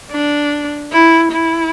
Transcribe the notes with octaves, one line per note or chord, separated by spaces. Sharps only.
D4
E4
E4